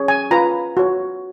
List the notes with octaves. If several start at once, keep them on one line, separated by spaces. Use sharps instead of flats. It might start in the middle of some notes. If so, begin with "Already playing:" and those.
Already playing: C#4 G#4 C#5
G#5
F4 B4 A#5
F#4 C#5